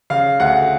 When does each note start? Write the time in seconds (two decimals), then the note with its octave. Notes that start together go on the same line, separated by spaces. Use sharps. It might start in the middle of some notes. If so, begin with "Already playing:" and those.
0.10 C#3 F5
0.40 D2 F#5